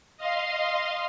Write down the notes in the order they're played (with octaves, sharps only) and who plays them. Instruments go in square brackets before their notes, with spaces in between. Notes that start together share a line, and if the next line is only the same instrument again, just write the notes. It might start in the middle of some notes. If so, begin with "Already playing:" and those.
[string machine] D#5 F5 C6